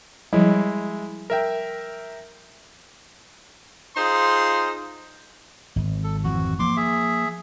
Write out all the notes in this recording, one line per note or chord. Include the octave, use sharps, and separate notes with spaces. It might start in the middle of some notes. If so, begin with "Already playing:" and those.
F3 G3 G#3 E4
A#4 E5 G5
D#4 F4 G#4 C5 C6
G#1
A4
G#1 F2 E3 F#4
F3 A#3 C6 D6
G#4 E5